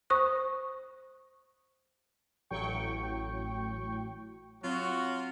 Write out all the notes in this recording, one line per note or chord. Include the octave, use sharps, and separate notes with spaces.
C5 B5 C#6 D#6 F#6
A1 A2 F#3 G5 C#6
F#3 C4 F4 F#4